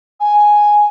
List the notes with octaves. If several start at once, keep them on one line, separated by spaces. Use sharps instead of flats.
G#5